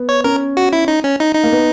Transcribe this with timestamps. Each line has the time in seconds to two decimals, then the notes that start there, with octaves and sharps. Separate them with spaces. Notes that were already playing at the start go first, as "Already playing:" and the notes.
Already playing: B3
0.09 C#5
0.24 C#4 A#4
0.57 F#4
0.73 E4
0.88 D#4
1.04 C#4
1.20 D#4
1.35 D#4
1.43 A#3
1.52 B3